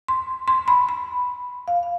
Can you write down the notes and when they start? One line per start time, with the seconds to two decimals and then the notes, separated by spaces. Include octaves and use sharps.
0.08 C6
0.48 C6
0.68 B5
0.89 B5
1.68 F5
1.83 F5